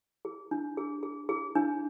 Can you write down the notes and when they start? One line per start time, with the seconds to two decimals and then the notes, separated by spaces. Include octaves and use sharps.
0.25 G#4
0.51 D4
0.77 G#4
1.03 G#4
1.29 G#4
1.55 D4